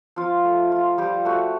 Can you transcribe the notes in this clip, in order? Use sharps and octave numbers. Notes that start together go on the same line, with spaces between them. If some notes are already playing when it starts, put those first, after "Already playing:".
F3 F4 F5
A3
F4
F3 G3 G4
A3 F#4